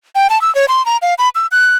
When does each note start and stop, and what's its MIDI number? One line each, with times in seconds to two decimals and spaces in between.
0.15 0.28 79
0.30 0.41 81
0.41 0.53 88
0.55 0.66 73
0.68 0.85 84
0.86 0.97 82
1.02 1.14 77
1.18 1.29 83
1.35 1.47 88
1.51 1.77 90